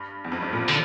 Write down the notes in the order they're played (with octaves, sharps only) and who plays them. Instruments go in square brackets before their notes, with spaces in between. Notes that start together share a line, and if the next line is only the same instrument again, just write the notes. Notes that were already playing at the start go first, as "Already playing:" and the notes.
Already playing: [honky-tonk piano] G2
E2
F2
G2
A#2
[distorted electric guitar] D3